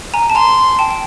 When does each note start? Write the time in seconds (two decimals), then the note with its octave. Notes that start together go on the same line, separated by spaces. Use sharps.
0.14 G#5 A#5
0.30 A5
0.35 G#5 A#5 C6
0.79 G5 A5
0.91 G5